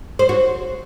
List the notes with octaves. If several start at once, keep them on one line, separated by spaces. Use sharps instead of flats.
C5
F#4